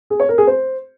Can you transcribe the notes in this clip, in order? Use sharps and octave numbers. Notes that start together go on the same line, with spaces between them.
G#4
C#5
A#4
G#4
C5